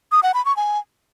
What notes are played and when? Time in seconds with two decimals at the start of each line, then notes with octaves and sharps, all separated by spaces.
0.12 D#6
0.23 F#5
0.34 B5
0.45 C#6
0.57 G#5